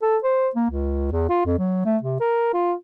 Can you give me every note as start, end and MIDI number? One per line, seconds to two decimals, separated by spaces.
0.02 0.17 69
0.24 0.49 72
0.56 0.66 58
0.71 1.11 37
1.12 1.25 40
1.29 1.44 65
1.46 1.56 41
1.59 1.84 54
1.85 1.97 57
2.03 2.19 48
2.20 2.52 70
2.54 2.73 65